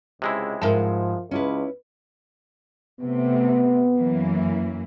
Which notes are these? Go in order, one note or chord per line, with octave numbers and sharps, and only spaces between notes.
C#2 C3 G#3 E4
F2 G#2 F3 A#4 E5 A5
C#2 C#4 E4 B4
C3 A3 B3
F#2 E3 A#3